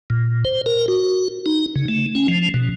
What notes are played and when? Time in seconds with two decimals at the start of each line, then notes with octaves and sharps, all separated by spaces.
0.10 A#2
0.45 C5
0.66 A#4
0.88 F#4
1.46 D#4
1.76 C#3
1.88 A3
2.15 C#4
2.28 F3
2.54 B2